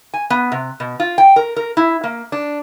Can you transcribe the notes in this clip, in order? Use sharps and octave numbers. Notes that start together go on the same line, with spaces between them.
G#5
B3
C3
B2
F4
G5
A#4
A#4
E4
A#3
D4